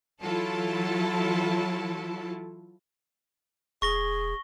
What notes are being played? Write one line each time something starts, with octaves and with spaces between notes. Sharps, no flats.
E3 F#3 E4 F4 A4 A5
E1 G#4 C#6 A#6 G7